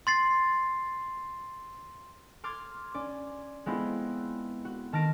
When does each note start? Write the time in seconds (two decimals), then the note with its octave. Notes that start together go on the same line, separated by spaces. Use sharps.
0.07 C6 A6 C7
2.44 C6 D6 F6 G#6 A6
2.94 C#4 D5 D6
3.66 G#3 B3 C4 E4 F4
4.65 F#4
4.93 D#3 A5 F6 A#6 D7